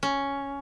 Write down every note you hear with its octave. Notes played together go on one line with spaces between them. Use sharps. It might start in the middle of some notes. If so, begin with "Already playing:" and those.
C#4